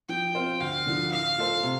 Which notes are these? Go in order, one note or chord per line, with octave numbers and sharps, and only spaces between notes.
F3 G5
C4 F4 C5
D2 F5
D3 F3
A2 F5
A3 F4 A4 C5
C3